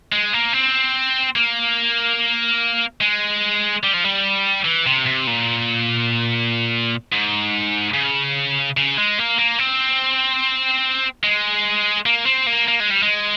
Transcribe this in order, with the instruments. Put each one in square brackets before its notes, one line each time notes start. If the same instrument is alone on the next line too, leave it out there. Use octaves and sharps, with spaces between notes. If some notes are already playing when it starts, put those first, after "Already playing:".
[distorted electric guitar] G#3
A#3
C4
A#3
G#3
G3
F3
G3
E3
C3
C3
A#2
G#2
C#3
C#3
G#3
A#3
A#3
C4
G#3
A#3
C4
A#3
A#3
G#3
G3
G#3